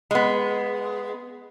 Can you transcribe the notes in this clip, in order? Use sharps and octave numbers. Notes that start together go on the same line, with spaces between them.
G#3 B3